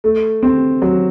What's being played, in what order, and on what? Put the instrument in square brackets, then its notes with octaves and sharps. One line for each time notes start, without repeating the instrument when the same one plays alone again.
[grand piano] A3
C4
F#3